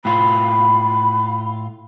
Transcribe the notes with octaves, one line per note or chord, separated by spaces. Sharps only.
A2 F4 B5